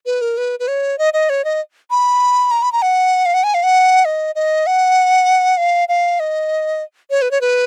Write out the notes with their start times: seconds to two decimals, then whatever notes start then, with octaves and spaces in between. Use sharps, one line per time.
0.06 B4
0.21 A#4
0.38 B4
0.60 B4
0.68 C#5
0.98 D#5
1.13 D#5
1.30 C#5
1.45 D#5
1.91 B5
2.51 A#5
2.62 B5
2.72 A#5
2.82 F#5
3.26 F5
3.34 F#5
3.44 G#5
3.54 F5
3.63 F#5
4.05 D#5
4.35 D#5
4.67 F#5
5.57 F5
5.89 F5
6.20 D#5
7.10 C#5
7.22 B4
7.31 C#5
7.41 B4